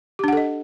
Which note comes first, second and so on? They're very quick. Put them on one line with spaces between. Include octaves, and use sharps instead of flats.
G4 D4 F#5 A4 D#5